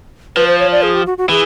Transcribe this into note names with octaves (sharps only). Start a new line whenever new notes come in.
F3 B4
C5
C#5
D5
G#4
G4
F#4
F#4
E3 G#4